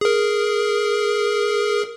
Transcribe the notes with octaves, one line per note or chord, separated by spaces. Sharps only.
G#4 A#4